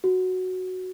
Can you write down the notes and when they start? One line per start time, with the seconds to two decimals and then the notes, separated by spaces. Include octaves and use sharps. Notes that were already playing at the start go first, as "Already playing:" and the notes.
0.04 F#4